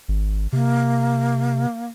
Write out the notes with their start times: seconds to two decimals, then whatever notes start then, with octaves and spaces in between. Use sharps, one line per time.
0.08 G#1
0.53 C3 A#3